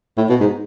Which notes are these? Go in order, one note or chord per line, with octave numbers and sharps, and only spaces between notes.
A2
B2
G#2